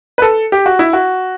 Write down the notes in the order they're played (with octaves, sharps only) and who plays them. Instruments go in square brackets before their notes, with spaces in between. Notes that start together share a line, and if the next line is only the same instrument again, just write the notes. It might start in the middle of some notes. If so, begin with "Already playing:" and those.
[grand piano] B4
A4
G4
F#4
E4
F#4